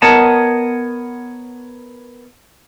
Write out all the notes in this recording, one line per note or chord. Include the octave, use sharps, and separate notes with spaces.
B3 A#4 C#5 D#5 F#5 A5